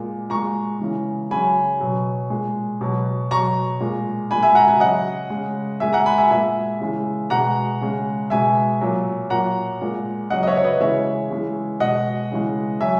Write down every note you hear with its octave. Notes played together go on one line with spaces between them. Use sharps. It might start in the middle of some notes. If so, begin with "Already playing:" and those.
Already playing: A#2 G#3
A#2 G#3 A#5 C#6
C#3 E3 G#3
C#3 F#3 G#5 B5
B2 F#3
A#2 G#3
B2 F#3
B2 F#3 A#5 C#6
A#2 G#3
A#2 G#3 G#5 B5
E5 G#5
F#5 A#5
E5 G#5
C#3 F#3 D#5 F#5
C#3 G#3
A#2 G#3 E5 G#5
F#5 A#5
G#5 B5
E5 G#5
A#2 G#3 E5 G#5
C#3 E3 G#3
B2 G#3 F#5 A#5
C#3 G#3
B2 G#3 E5 G#5
A#2 F#3
A#2 F#3 F#5 A#5
A#2 G#3
C#3 F#3 D#5 F#5
D#5
C#5 E5
C#5
B4 D#5
C#3 E3 G#3 C#5 E5
C#3 E3 G#3
B2 G#3 D#5 F#5
C#3 E3 G#3
F#3 E5 G#5